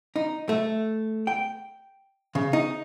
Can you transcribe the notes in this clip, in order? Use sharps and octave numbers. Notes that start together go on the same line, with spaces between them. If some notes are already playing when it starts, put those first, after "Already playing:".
D#4
A3
G5
C#3
D#4